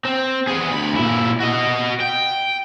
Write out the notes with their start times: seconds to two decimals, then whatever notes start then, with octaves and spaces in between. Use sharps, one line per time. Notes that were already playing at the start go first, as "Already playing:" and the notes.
0.05 C4
0.47 B3 G#4
0.72 D2 B5
0.95 A#2 E4
1.40 F#4 D#5
2.01 G5